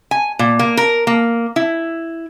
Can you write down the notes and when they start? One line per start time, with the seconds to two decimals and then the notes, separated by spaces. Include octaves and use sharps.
0.11 G#5
0.39 A#2
0.59 A#3
0.77 A#4
1.07 A#3
1.56 E4